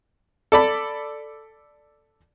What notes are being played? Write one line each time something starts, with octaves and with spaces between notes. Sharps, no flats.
A4 D5 B5